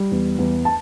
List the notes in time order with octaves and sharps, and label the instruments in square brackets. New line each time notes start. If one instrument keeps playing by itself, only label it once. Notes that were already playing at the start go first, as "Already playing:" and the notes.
Already playing: [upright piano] G3
E2
E2
A5